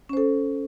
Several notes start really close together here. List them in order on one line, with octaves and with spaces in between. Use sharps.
C#4 C5 A4